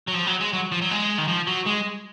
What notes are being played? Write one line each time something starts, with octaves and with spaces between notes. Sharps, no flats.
F#3
F3
F#3
G#3
F#3
F3
F#3
G#3
D#3
F3
F#3
G#3